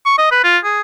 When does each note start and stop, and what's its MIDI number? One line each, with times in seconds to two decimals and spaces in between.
0.06 0.17 85
0.18 0.29 75
0.31 0.40 71
0.44 0.57 65
0.64 0.81 68